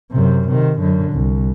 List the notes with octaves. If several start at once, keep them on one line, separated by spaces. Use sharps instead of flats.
F#2 C3
C3 D#3
F#2 D3
C2